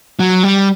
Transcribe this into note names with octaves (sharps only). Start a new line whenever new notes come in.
F#3
G3